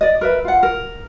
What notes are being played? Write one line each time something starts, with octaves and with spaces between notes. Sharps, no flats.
D5 D#5
A#4 B4 E5
F4 F#5
A#4